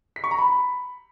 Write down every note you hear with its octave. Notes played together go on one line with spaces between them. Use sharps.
B6
C#6
A#5
B5